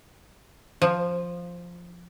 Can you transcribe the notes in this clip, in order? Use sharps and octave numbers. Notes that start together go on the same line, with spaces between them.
F3